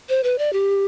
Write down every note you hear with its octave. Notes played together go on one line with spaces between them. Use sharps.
C5
B4
D5
G4